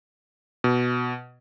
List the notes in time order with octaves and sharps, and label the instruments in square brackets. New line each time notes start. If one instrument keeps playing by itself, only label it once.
[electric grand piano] B2